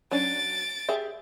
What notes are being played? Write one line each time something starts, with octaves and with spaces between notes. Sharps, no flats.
F#3 C#4 D4 A6 D7
G4 G#4 E5